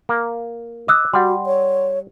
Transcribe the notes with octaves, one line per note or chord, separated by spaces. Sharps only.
A#3
D#5 D6 E6 F#6
G3 F#4 F#5 C6
C#5